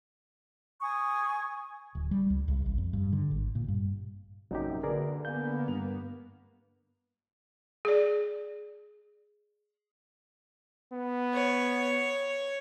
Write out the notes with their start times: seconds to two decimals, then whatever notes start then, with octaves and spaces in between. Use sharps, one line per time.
0.81 G#5 C#6 D#6
1.95 D1
2.11 G3
2.30 C#2
2.48 C2
2.66 A1
2.78 F2
2.93 G2
3.12 D3
3.31 G#1
3.55 A#2
3.68 G2
4.51 A#1 F#2 C3 F#3 D#4 G4
4.83 D3 A#3 F#4 G#4 A#4 B4 D5
5.25 A#3 B3 F5 G#5 G6
5.68 G2 F7
7.85 G#4 D5
10.93 B3
11.34 C#5